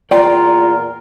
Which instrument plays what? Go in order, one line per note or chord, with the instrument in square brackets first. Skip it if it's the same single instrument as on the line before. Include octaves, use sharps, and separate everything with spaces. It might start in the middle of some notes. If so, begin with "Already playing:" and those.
[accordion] E2 A#2 A#4 [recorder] F4 [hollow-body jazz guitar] D5 G5 C6